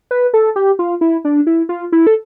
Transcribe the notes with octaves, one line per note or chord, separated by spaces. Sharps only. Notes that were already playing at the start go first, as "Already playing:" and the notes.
B4
A4
G4
F4
E4
D4
E4
F4
E4
A4